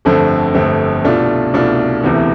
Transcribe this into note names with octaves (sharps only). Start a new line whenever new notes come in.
G1 F2 D3 A3 C4
G1 F2 D3 A3 C4
C2 B2 A3 D4 F4
C2 B2 A3 D4 F4
E1 D2 C3 E3 B3